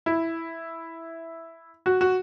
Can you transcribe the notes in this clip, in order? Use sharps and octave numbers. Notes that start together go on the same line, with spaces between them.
E4
F#4
F#4